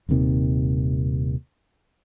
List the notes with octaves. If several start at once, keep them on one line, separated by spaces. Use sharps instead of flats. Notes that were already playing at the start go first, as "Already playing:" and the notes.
D#1 D#2 C3 D#3